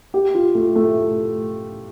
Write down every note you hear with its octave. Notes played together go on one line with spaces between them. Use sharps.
G4
F4
A3
A3